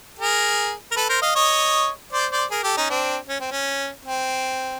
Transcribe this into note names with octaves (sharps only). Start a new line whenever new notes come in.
G#4 A#4
A#4
A4 B4
A#4 C5
D#5 F5
C#5 D#5
C5 D5
C5 D5
G#4 A#4
G4 A4
C#4 D#4
C4 D4
C#4
C4
C#4
C4